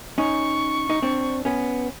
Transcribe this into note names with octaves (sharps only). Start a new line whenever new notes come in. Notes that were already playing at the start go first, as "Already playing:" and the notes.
C#4 D#4 C#6
D#4
C4 D4
B3 C#4